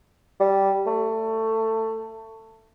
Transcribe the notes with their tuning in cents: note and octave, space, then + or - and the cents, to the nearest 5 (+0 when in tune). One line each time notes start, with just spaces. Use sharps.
G3 -5
A3 +20